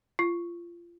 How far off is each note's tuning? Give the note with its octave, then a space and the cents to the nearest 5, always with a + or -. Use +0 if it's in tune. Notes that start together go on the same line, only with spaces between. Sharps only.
F4 -25